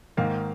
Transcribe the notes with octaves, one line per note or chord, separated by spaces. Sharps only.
G#2 D#3 A#3 F5